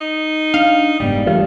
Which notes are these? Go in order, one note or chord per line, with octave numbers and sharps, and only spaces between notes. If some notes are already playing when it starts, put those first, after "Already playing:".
D#4
D4 F5
F#1 G#2 G3 B3
D2 E3 G3 A3 F4